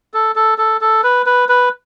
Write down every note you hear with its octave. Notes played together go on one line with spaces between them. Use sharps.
A4
A4
A4
A4
B4
B4
B4